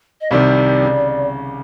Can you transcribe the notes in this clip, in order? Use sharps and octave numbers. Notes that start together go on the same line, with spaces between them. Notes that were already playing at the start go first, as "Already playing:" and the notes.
D#5
C2 C3 D#3 G3 D5
C#3